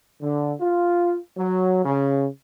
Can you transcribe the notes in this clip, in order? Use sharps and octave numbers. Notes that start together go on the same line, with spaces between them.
D3
F4
F#3
C#3